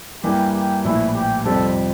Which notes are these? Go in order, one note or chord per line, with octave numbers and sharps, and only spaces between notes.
G2 E3 A#3 G4
G4
A#1 A2 E3 E4
G4
F2 C3 G3 C4 G4 A4